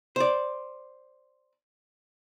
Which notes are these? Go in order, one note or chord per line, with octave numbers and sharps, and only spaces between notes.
C5 D5